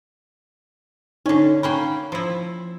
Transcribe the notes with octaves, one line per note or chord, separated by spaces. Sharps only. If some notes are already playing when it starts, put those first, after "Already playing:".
D3 C#4 D#4 C#5
A#3 C#4 G5 B5
F3 E4